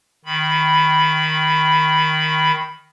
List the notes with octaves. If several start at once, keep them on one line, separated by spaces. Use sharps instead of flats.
D#3 B5